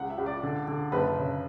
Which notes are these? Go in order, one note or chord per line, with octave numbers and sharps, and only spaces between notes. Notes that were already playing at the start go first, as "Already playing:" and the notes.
Already playing: C#2 F#5
E5
C#2
D5
D3
D3
F#1 B4
C#3